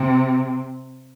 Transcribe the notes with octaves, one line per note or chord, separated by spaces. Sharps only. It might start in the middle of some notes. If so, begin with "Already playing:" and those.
Already playing: C3